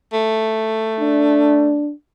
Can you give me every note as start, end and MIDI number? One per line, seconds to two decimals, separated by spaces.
0.13 1.84 57
1.01 1.92 62